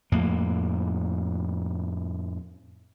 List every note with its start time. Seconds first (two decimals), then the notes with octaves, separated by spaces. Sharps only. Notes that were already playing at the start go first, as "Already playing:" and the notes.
0.12 F2 A2 A#3